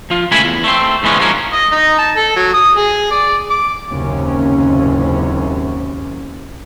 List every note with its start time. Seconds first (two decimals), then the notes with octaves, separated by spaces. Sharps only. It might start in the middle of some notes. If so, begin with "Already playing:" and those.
0.10 F3 F4
0.32 C#2 A3 E4 G#5 B5
0.44 E2
0.64 A3 C4
1.03 G#2 E3 G#3 B3 C#4
1.19 F3 G3 G#3 A#3 C#4
1.53 D#5
1.72 D#4
1.98 A5
2.16 A4
2.36 F#3
2.54 D#6
2.77 G#4
3.11 D5
3.50 D6
3.90 F#1 D#2 G#2 C3 C#4